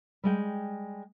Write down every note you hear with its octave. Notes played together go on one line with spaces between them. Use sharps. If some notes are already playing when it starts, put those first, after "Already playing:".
G3 G#3 G5